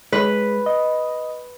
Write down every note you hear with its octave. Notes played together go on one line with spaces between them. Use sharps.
G#3 B4
D#5